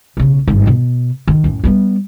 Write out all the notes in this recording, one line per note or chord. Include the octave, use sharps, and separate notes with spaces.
B1 C#3
G#1 G2
B2 B3
D#3
F#2 A2
G3 B3